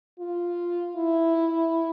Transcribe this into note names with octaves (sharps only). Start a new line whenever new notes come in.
F4
E4